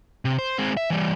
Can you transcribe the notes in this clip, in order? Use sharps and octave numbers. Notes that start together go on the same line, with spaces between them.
C3
C5
G#3 C4
E5
E3 G3